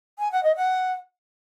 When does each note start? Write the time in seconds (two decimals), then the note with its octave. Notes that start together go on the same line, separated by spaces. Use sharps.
0.19 G#5
0.32 F#5
0.43 D#5
0.56 F#5